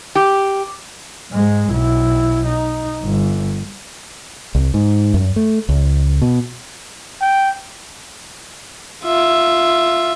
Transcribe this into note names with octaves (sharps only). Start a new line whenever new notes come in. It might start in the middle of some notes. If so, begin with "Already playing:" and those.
G4
G#2 G#3
B1 E4
D#4
G1
C2
G#2
F#2
A3
C#2
B2
G5
F4 E5